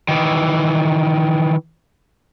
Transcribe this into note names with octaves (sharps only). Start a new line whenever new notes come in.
D#3 E3